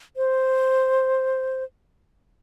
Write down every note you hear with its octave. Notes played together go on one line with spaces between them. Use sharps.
C5